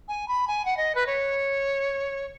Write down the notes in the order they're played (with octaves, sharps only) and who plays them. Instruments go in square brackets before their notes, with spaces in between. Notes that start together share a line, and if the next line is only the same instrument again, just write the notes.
[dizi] G#5
B5
G#5
F#5
D#5
B4
C#5